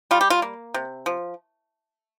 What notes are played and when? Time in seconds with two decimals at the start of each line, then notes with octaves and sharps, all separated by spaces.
0.11 G3 F4
0.21 G4
0.30 F4
0.42 A#3
0.74 C3
1.06 F3